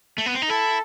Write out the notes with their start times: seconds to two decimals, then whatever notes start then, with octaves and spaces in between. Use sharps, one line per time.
0.18 A3
0.26 B3
0.35 C4
0.42 D#4
0.49 E4 A4